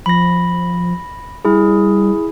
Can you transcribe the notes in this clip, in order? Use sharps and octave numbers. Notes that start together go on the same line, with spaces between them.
F3 B5 A#6
G3 E4 G#4